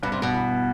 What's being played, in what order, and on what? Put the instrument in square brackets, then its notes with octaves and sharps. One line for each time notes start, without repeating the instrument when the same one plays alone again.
[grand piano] G2 [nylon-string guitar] B2
[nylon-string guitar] C3
B2
[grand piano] E3